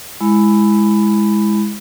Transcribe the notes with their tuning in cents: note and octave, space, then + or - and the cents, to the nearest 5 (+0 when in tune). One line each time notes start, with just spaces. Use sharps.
G#3 +0 E4 +0 B5 +10